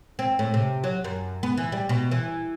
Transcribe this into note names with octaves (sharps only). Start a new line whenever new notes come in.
C4
A2
C3
F#3
F#2
B3
E3
G3
B2
E3